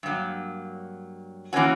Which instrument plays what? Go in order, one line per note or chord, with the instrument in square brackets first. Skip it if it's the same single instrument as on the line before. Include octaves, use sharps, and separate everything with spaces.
[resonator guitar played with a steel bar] G2 F#3 A#3
E3 A#3 C#4 F#4